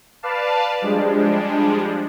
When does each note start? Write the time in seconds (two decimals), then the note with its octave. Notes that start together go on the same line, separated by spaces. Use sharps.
0.23 B4 D5 F5 A5
0.81 F3 G3 G#3 D4